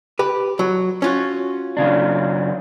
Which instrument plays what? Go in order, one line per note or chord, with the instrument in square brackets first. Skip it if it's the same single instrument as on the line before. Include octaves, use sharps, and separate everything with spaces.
[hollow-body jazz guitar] G4 B4
F#3
C#4 F4 F#4
[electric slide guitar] F#2 C#3 D4